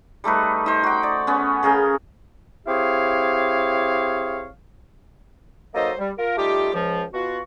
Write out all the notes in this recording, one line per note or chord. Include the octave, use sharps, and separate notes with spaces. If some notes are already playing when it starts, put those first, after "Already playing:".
G3 A3 D#4 B4
D#4 C5
F#4 G5
D5
B3 C#4
C#3 G#4 A#4 G5
C4 E4 G4 G#4 C#5 F5
F#3 A#3 D#4 A4 C5 D#5
G3
F4 A#4
G3 A3 D#4 F4 G4
C#2 F3
B2 F4 F#4